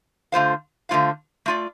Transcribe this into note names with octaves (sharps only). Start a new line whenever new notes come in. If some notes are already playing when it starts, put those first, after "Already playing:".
D3 A3 F4 C5 F5
D3 A3 F4 C5 F5
A3 F4 D5